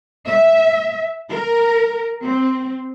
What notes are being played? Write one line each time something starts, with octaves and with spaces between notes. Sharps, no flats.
E5
A#4
C4